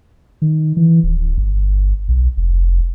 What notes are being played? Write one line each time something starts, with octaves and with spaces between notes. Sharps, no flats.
D#3
E3
D1
G1
B1
F1